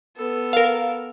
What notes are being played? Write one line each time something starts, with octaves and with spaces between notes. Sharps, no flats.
B3 A4
A#4 F5